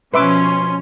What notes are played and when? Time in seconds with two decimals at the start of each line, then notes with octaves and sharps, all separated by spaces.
0.14 B2 F3 C#4 B4 E5 C6 D6